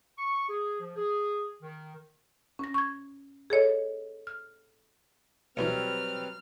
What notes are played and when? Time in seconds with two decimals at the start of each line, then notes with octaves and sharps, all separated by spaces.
0.18 C#6
0.48 G#4
0.80 F3
0.96 G#4
1.62 D#3
2.59 C#4 A#6
2.74 C#6 G#6
3.50 G#4 A4 C#5 D#5
4.27 F6
5.57 D2 B2 E3 F#3 G3 C4 B4 F6